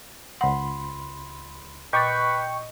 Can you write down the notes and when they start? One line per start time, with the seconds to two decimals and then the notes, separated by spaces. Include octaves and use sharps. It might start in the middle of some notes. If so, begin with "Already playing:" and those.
0.41 C#2 F#5 B5 C6
1.93 A#2 B4 D#5 G5 C#6 D6 A6